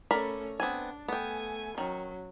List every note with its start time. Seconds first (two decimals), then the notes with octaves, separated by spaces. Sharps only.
0.11 A3 C#4 A#4 D5 B5
0.60 B3 C4 D4 G#5
1.08 A3 B3 G5 G#5
1.78 D#3 F#3 C#4